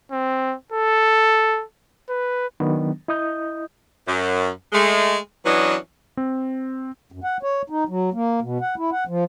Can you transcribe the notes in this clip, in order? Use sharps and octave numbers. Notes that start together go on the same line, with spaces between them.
C4
A4
B4
D#3 F#3 B3 D4
E4 D#5 D#6 G6
F#2
G#3 A3
E3 F#3 B3 C#4 D4 D#5
C4
F#2
F#5
C#5
D#4
F#3
A#3
B2
F#5
E4
F#5
F3